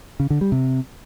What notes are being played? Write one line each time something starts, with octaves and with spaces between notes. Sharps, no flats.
C#3
D3
G3
C3